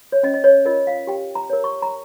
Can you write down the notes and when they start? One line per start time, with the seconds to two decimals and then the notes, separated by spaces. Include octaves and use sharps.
0.12 C#5
0.23 C#4 D#5
0.34 D#5
0.44 C#5
0.65 F4 A#4 D#5
0.87 F5
1.07 G4 G5
1.35 A#5
1.50 A#4 C#5
1.64 C#6
1.82 A#5